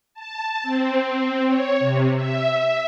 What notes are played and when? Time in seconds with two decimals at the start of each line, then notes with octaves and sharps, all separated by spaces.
0.14 A5
0.63 C4
1.46 C#5
1.79 C3
2.15 E5